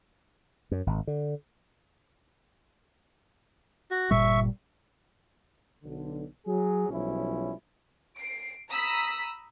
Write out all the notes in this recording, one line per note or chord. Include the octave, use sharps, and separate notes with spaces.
F#2
G#1
D3
F#4
G1 A#2 G3 E5 C#6
B1 D3
F#3 G#4
B1 F3 G3 C#4 E4
C7 D7
A#5 B5 D#6 E6 B6